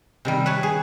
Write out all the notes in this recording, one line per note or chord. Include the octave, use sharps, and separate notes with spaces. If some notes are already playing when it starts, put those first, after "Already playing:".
C3 D#3 G3
B4 C#5 A5
G#4